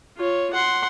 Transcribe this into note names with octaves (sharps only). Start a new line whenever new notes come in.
F4 C#5
F#5 C6